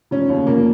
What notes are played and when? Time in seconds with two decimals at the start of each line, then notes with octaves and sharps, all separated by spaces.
0.11 F1 C#4
0.29 D#2 C#3
0.47 F1 A#3